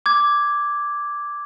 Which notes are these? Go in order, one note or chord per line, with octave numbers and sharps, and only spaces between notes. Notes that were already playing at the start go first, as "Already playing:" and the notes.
D6 G#6